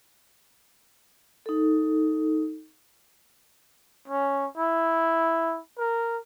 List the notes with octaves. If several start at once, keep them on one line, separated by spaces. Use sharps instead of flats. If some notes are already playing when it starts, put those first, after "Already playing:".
D#4 A4
C#4
E4
A#4